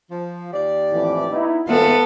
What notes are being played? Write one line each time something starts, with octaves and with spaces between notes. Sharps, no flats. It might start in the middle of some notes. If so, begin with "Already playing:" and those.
F3
D#2 G4 D5
F2 A2 E3
B3 D#4 E4
G#1 B3 F4 A4 C5 E5